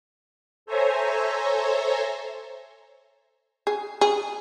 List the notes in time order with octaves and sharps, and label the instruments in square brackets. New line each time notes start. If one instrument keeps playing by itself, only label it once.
[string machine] A4 C5 C#5 E5 G#5 A#5
[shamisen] G#4
G#4